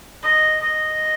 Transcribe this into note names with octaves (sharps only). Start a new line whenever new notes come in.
D#5
D#5